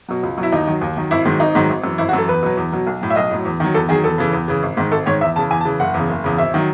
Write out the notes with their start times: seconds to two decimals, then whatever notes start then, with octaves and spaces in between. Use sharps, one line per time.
0.08 B2 F#3
0.23 C#2
0.37 B2 F#3
0.43 E4
0.52 D#2 D#4
0.67 D#3 F#3
0.81 D#2
0.97 D#3 F#3
1.11 G#1 E4
1.25 G#2 D#3 F#3
1.40 G#1 D#4
1.55 G#2 D#3 F#3
1.70 G#1
1.84 F#2 E3
1.98 G#1 E4
2.09 F#4
2.13 F#2 E3 A4
2.28 E2 B4
2.43 B2 F#3
2.57 E2
2.72 B2 F#3
2.87 B1
3.01 A2 F#3
3.10 E5
3.16 B1 D#5
3.31 A2 F#3
3.45 E2
3.60 D#3 F#3
3.74 E2 A4
3.89 D#3 F#3 G#4
4.04 E2 A4
4.18 C#3 E3
4.33 E2
4.48 C#3 E3
4.63 G#1
4.77 G#2 D#3
4.92 G#1 A4
5.06 G#2 D#3 C#5
5.21 E2 E5
5.36 C#3 E3 A5
5.50 E2 G#5
5.61 A5
5.65 C#3 E3
5.80 F#1 F#5
5.94 E2 C#3
6.09 F#1
6.24 E2 C#3
6.38 G#1 E5
6.54 D#3 F#3